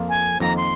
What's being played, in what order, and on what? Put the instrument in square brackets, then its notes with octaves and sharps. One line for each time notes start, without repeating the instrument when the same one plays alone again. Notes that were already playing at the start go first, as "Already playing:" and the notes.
Already playing: [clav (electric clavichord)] F2 F3 A#3 F4
[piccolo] G#5
[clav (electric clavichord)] F2 D#3 A#3 [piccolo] A#5
[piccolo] C6